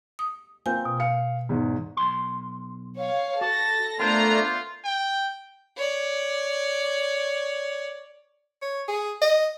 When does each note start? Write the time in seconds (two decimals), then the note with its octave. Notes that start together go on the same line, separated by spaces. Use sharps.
0.19 D#6
0.66 A#3 C4 F4 G#5 G6
0.85 B2
1.00 F5 C#7
1.49 E2 G#2
1.97 B1 C6
2.98 C#5 F5
3.41 F#4 A4 A5 A#6
3.99 A3 B3 D4 F4 A#4 C5 A#5
4.85 G5
5.76 C#5 D5
8.62 C#5
8.88 G#4
9.22 D#5